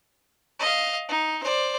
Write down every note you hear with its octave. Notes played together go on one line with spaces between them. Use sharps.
D#5 F5
D#4
C5 D5